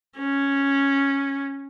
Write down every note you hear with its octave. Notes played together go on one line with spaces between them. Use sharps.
C#4